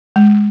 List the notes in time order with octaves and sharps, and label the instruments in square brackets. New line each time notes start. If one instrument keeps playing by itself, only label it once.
[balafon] G#3